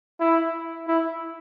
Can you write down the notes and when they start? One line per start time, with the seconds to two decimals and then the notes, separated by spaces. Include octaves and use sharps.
0.20 E4
0.88 E4